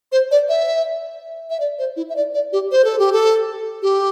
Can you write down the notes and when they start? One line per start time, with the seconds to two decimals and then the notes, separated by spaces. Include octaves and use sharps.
0.12 C5
0.31 D5
0.49 E5
1.50 E5
1.60 D5
1.79 C5
1.97 E4
2.10 E5
2.16 D5
2.34 D5
2.53 G4
2.72 C5
2.85 A4
2.99 G4
3.12 A4
3.82 G4